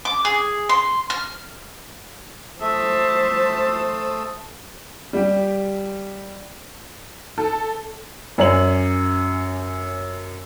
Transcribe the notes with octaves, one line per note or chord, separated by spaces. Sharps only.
D6
G#4
C6
F6
A3 A4 C5 E5 A5 D#6
G3 G4
A4
F#2 C#4 F#7